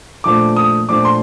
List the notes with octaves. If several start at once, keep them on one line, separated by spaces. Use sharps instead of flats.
A#2 F3 A3 D4 D6
D#6
A#2 F3 A3 D4 D6
C6